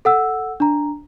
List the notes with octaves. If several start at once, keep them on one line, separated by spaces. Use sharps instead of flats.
A4 F#5 E6
D4 A#5